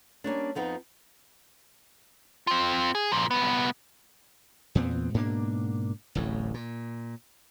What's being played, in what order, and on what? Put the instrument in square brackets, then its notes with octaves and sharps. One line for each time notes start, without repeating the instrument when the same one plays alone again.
[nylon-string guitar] G3 A#3 C#4 D4
F2 F3 B3 D#4
[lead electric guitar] C4 F4
G#4
A#2 F3
C2 B3
[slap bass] E2 A#2 B3 C4
G#2 B2 A#3 D4
D1 A1 A2
A#2